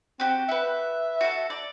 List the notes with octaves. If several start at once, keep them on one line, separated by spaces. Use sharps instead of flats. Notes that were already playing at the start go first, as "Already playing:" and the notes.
C4 F#4 G4
F#4 B4 E5
F#4 A4
D5